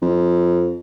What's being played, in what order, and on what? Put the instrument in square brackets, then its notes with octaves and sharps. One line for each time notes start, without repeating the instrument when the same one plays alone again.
[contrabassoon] F2